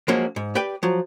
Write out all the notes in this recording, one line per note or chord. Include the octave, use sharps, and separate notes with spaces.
F3 F#3 G#3 A#3 C#4 F#4
G#2
G4 B4 D5 G5
F3 F#3